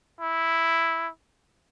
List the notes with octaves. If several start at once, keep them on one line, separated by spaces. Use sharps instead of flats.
E4